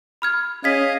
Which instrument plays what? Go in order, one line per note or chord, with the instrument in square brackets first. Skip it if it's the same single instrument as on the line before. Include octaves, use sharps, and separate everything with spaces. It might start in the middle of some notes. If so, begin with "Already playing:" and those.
[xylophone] B5 F6 G#6
[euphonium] C#4 [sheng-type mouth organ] G#4 D#5 F5 [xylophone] G#6 B6